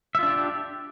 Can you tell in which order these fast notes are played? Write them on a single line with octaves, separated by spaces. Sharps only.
E5 F4 D4 G4